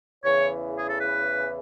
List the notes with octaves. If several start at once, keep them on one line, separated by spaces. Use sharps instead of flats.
E2 C#3 E3 C#5
G#4
A4
B4